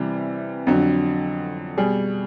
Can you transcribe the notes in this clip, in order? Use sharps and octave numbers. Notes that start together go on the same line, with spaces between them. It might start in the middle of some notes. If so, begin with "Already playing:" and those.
Already playing: C3 E3 G3
F2 D3 F#3
B2 G3 G#4